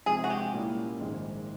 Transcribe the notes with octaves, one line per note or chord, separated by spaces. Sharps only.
C3 F3 G#3 G#4
F#4
G4
A#2 G3 A#3 C#4 E4
A#1 G#2 D#3 G#3